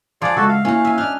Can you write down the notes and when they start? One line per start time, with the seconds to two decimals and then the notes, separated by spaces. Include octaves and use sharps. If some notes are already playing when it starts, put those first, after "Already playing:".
0.22 F3 G#4 D5 F5 F#5 A5 C6
0.37 C#3 G#3 F#4 A4 E5
0.49 F5
0.65 A#3 C#4 E4 F#4
0.84 E5 G#5
0.98 D4 D#4 F6 F#6